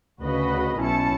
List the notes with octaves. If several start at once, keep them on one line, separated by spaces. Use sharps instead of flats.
D2 C#3 F#4 B4 D#5 B5
B1 B2 C#4 E4 A5 C#7